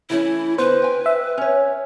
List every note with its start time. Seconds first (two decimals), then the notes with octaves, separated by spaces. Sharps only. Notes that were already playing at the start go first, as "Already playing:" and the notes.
0.10 E3 A3 C#4 E4
0.58 D3 B3 B4 C5
0.82 G5 G#5
1.06 E5
1.38 C#4 C#5